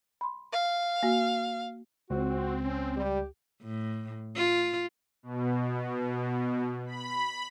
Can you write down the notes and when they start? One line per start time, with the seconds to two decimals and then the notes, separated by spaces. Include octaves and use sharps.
0.21 B5 C6
0.53 F5
1.03 A#3 F#4
2.10 C#2 C4 F#4
2.63 C#4
2.97 G3 G4
3.62 A2
4.36 F4
5.23 B2
6.87 B5